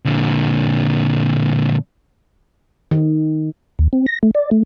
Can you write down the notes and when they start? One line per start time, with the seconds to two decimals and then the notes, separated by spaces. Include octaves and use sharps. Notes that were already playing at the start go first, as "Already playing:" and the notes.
0.05 A#2 D3
2.91 D#3
3.79 D#2
3.93 C4
4.07 A#6
4.23 A3
4.35 D5
4.51 A3